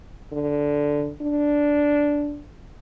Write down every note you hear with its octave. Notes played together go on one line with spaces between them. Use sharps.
D3
D4